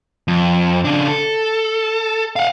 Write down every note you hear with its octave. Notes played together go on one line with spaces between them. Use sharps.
F2
C#3 D4
A4
F5 F#5